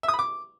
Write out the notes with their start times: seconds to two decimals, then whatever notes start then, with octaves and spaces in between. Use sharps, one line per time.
0.03 E5
0.08 D#6
0.14 B5
0.19 D6